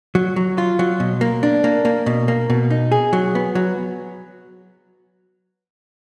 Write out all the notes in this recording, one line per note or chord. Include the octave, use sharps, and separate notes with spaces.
F#3
F#3
F4
F#3
B2
A#3
D4
A#3
A#3
B2
A#3
B2
D#4
G#4
F#3
B3
F#3